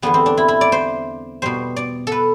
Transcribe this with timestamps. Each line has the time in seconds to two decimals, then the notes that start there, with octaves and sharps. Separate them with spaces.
0.02 E2 D3 G3 B3
0.14 C4
0.26 D4
0.38 E4
0.48 E4
0.61 D5
0.72 C5
1.42 B2 G3 C5
1.77 D5
2.07 A4 B4